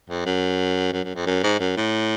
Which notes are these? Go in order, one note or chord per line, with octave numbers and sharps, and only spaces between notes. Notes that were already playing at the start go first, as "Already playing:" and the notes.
F2
F#2
F#2
F#2
F2
F#2
G#2
F#2
A2